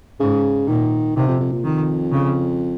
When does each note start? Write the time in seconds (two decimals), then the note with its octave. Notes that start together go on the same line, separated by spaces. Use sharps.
0.20 G#2 C#3
0.68 A#2 D#3
1.16 C3 D#3
1.28 F2
1.40 F2
1.52 A#2
1.64 F2 D#3
2.12 C#3